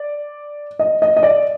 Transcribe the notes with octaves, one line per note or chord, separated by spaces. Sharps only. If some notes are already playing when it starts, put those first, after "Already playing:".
Already playing: D5
D#5
D#5
D#5
D5